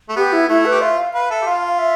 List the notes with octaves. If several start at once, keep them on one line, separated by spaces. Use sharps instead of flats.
A3
B3 G4
E4
A3 E4
B4
G4
F4 E5
F5
B4 F5
A4 E5
G4
F4 F5
F5
E5